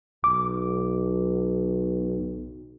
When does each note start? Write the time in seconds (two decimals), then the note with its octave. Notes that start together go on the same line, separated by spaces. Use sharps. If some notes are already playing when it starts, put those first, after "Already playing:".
0.24 B1 D6